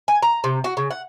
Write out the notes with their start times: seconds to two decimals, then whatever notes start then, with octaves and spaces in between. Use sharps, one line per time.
0.08 G#5
0.23 A#5
0.44 C3
0.64 F#4
0.77 C#3
0.91 F#5